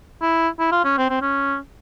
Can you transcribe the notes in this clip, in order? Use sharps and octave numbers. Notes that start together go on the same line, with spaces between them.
E4
E4
F4
C#4
C4
C4
C#4